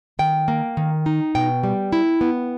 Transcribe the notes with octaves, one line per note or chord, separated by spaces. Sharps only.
D#3 G5
A#3
D#3
D#4
B2 G5
G3
E4
B3